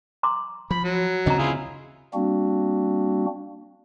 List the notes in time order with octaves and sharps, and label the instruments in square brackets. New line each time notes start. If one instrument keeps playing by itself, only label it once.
[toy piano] A#5 C6 D6
[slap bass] F3 [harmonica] B5
[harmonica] F#3
[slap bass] D2 C#3 C4 [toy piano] D#5 A#5
[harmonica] E4 F4 G#4
[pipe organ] G3 A#3 C4 D4 F#4